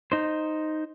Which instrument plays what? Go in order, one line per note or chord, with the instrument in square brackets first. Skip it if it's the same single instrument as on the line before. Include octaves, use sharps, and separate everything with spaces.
[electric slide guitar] D#4 C5